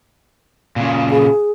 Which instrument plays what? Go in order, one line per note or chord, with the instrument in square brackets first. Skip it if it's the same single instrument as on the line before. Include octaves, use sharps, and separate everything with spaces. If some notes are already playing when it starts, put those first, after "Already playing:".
[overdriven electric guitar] A#2 C#3
[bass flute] G#4